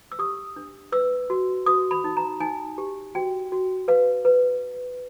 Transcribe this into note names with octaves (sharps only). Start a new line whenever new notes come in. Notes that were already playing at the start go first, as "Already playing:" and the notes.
E6
G4 D#6
D4
B4 E6
F#4
F#4 D#6
B5
D#4
A#5
D#4 G#5
G4
F#4 G5
F#4
B4 F5
B4